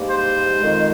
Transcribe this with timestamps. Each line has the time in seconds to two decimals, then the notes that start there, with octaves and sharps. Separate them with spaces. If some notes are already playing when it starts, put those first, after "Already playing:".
Already playing: G#2 G3 A#3
0.08 C5
0.58 F2 D#3 G#3